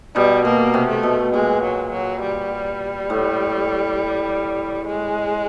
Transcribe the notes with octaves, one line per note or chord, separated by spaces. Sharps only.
B2 G3
B2 A#3
C3
A3
B2
A#2 G#3
F#3
F#3
G3
A2
G#3